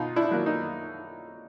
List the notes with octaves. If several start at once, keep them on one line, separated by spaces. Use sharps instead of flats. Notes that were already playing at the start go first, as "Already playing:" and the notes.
Already playing: B2 D#4 F4
D4 E4
F#3 A#3
D#4